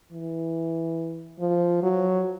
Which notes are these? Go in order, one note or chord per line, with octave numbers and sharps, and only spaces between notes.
E3
F3
F#3